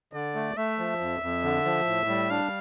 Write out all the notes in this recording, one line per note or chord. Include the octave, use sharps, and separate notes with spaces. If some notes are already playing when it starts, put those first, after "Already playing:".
D3 D5
A3
A3 E5
F3
F2
F2
D3
F3
A2
G3
D4 F5